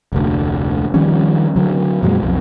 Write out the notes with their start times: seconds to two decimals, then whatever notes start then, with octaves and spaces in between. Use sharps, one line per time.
0.13 F1 D2
0.94 D#3 F3 G3 C#4
1.56 D3 F#3
2.03 F2 A#2 F#3 G#3
2.22 B1 F2